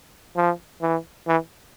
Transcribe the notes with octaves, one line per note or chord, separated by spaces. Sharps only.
F3
E3
E3